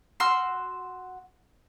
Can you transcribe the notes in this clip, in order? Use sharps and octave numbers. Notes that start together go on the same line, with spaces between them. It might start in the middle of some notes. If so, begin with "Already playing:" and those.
F#4 C6 E6 F6